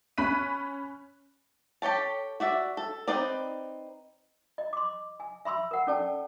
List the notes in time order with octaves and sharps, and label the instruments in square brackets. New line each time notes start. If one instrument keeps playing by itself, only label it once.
[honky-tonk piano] C#4 B5 C#6 F#6 B6 D#7
[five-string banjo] G4 A4 C#5 A5
F#4 D5 E5
A4
C4 D#4 B4 D5
[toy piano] D#5
C6 D6
G#5
E5 B5 C6 E6
A#4 F#5
C#4 A4 D5 G5 A5